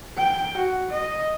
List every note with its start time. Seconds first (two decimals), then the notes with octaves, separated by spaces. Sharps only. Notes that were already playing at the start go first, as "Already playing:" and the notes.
0.17 G5
0.57 F#4
0.90 D#5